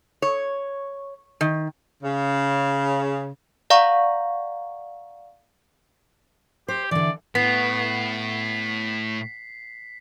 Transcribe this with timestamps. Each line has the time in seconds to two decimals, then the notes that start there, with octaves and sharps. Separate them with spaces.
0.22 C#5
1.41 D#3
2.03 C#3
3.70 D5 F5 F#5 A#5 C#6
6.68 G4 C5
6.91 D3 E3 D5
7.35 A2 B3 B6 C7